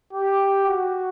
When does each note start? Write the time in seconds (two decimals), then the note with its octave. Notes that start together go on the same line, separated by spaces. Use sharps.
0.13 G4
0.66 F#4